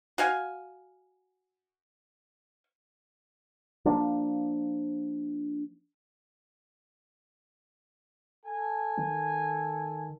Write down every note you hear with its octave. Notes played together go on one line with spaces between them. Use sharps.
F#4 F5 G#5
F3 A#3 D4
A4 G#5
D#3